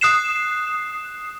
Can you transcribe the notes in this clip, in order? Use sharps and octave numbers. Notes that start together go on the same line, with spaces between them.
D#6 F#6 C7 E7